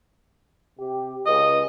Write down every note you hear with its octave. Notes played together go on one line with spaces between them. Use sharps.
C3 G4
C#2 D#5